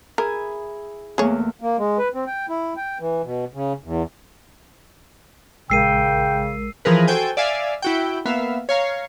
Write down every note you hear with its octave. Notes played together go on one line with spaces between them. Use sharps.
E4 G#4 A#4 G#5
E2 A3 A#3 G#4 C#5
A#3
G#3
B4
C4
G5
E4
G5
E3
B2
C#3
E2
A#1 C#3 G#3 A#4 G5 E6 C7 D#7
E3 F3 G#4 A#4 B4
F#4 A4 C5 G5 G#5
D5 E5 F5 G#5
E4 F#4 G5
A#3 B3 E5 F5
C#5 F5 A#5